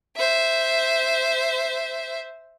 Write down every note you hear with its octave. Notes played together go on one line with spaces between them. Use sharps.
C5 E5